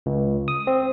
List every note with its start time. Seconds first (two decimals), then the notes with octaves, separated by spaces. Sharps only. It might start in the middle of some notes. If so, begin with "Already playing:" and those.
0.06 C#2
0.48 D#6
0.67 C4